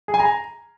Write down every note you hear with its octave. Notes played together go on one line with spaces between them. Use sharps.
G#4
G#5
A#5